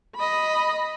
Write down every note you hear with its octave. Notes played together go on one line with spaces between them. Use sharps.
D#5 B5